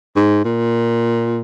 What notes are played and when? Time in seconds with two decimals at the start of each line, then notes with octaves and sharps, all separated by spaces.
0.16 G#2
0.44 A#2